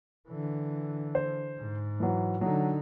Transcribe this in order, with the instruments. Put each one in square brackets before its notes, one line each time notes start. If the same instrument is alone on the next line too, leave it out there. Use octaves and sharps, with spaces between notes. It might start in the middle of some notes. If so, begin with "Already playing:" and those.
[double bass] D3 E3
[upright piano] C5
[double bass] G#2
[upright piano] E3 F#3
[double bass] D3 D#4 [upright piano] F#3